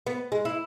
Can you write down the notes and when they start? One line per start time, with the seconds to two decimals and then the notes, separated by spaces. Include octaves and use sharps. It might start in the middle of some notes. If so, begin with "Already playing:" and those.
0.07 B3
0.32 G#3
0.45 E4